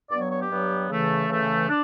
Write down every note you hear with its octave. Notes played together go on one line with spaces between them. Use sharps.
G2 F#3 B3 D5
C#5
C#5
G4
G2 F#3 B3
C#3 E3 A3
C#3 E3 A3
D4